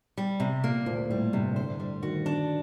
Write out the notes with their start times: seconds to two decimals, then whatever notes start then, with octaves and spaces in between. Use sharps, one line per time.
0.18 G3
0.40 C3
0.63 A#2 A#3
0.86 D2 A#2
1.10 A2 G3
1.33 G2 C3
1.56 D3 C5
1.80 G3
2.03 D#3 F#4
2.26 D4